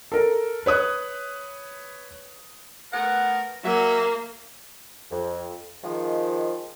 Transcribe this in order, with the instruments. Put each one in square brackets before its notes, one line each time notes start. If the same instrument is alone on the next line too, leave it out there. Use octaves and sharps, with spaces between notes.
[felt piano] A4 A#4
B4 C#5 D#6 F#6
[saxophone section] A3 B3 F#5 [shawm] A#4
[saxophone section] F#3 [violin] A#3 [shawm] E5
[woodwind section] F2
D#3 F3 G#3